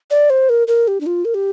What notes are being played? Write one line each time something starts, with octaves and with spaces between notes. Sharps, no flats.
D5
C5
A#4
A#4
G4
D4
F4
A#4
G4